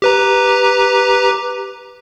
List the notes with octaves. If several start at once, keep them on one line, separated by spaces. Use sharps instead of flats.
G4 B4 A#5